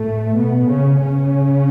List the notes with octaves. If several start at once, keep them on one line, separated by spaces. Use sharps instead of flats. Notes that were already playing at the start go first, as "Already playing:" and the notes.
Already playing: A2 A3
B2 B3
C#3 C#4
C#3 C#4